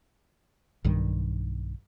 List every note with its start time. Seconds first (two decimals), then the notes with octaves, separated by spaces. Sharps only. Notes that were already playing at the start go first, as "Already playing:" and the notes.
0.84 B1 G2 D#3 G3